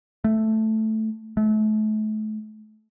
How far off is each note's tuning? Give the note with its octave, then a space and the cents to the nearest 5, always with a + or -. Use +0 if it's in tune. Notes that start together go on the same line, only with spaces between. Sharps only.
A3 +0
A3 -35